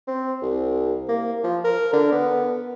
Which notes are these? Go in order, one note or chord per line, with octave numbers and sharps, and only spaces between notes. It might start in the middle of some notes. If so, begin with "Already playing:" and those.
C4
C2
A#3
F3
A#4
D3
B3